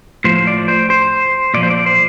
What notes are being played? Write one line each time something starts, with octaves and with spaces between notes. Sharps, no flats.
A2 F3 C5
D5
C5
C5
A#2 F3 D5
C5
D5
C5